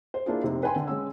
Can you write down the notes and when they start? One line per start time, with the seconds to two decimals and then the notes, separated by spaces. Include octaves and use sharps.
0.14 C5
0.26 A#3 D4 E4 F4 G#4
0.43 F1 C3 C4 D#4
0.63 B4 G5 G#5 B5 C6
0.76 D3
0.87 G#3 C#4 E6